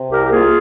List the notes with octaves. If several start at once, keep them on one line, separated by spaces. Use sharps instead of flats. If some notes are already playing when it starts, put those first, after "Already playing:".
Already playing: C3
C2 G4 A#4
G4
A#3 F4 G#4